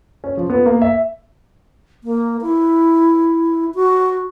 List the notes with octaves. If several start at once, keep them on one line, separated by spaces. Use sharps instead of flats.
C#4
F3
B3
A#3
E5
A#3
E4
F#4